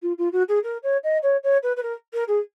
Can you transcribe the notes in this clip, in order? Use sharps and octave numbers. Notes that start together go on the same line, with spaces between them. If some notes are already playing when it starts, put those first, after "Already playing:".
F4
F4
F#4
G#4
A#4
C#5
D#5
C#5
C#5
B4
B4
A#4
A#4
G#4